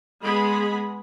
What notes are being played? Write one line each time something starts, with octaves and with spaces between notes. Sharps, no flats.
G#3 B3 G#4 B5